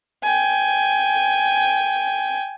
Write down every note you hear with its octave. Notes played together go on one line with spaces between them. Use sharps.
G5 G#5